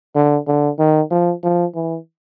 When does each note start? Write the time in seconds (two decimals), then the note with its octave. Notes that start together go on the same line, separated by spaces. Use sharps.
0.15 D3
0.47 D3
0.79 D#3
1.11 F3
1.43 F3
1.75 E3